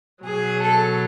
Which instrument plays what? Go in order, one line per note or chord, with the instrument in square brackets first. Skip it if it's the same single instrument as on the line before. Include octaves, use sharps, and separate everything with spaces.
[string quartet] B2 F#3 G#4
A4